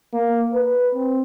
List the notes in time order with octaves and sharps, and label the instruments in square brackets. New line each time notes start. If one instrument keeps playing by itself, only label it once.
[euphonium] A#3
B4
C4